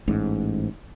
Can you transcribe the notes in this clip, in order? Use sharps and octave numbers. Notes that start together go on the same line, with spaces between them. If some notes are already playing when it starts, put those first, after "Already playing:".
A1 G#2